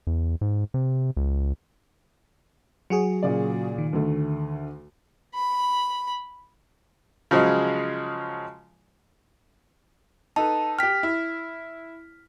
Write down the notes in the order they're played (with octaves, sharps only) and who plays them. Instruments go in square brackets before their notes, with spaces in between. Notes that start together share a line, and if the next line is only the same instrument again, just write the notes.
[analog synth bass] E2
G#2
C3
C#2
[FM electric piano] F#3 F#4 G#4 [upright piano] C#7
[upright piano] A#2 C#3 D5
[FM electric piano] D#3
[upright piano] D2 D3 A3
[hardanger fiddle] B5
[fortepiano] C#3 F3 F#3 G#3
[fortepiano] D#4 A4 B4 [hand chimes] A5
[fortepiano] G4 G5 [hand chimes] F6 B6
[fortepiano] E4